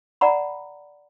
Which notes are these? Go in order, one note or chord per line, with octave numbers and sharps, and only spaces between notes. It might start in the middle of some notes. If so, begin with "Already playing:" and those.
D5 F#5 A#5 B5